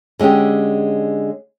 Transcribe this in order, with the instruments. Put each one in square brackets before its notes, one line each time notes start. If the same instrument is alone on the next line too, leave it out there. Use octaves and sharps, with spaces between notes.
[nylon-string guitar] D3 G#3 C#4 G4 G#4